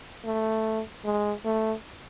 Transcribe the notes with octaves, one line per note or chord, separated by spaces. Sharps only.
A3
G#3
A3